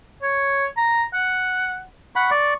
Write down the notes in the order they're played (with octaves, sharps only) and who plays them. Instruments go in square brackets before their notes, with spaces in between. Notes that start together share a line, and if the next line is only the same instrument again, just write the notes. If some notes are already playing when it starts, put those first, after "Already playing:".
[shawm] C#5
A#5
F#5
[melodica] F#5 B5 [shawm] C#6
[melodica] D5